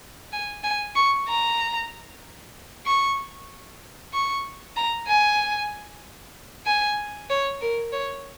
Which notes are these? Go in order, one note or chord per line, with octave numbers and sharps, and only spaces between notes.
G#5
G#5
C#6
A#5
C#6
C#6
A#5
G#5
G#5
C#5
A#4
C#5